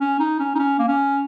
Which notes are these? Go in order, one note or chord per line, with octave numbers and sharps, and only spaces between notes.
C#4
D#4
C#4
D#4
C#4
A#3
C#4